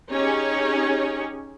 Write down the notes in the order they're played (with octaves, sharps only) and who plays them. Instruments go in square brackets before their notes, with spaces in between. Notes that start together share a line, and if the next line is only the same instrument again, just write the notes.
[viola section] C#4 D#4 G4 G#4 C#5